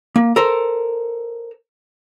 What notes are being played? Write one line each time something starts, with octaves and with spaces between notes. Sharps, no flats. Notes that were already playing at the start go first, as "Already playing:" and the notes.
A#3
A4 A#4 C5